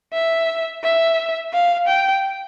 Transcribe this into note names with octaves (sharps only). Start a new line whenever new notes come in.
E5
E5
F5
G5